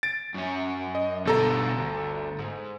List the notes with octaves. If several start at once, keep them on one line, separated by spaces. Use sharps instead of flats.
A6 D7
F#2 C#4
D#5
G1 B2 D3 A4 A#5
D2
G#2